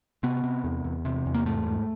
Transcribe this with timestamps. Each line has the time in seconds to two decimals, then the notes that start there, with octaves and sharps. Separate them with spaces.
0.23 C3 B3
0.44 C3
0.64 E2
0.84 E2
1.05 C3
1.26 E2
1.34 A#3
1.45 G#2 A3
1.66 G#2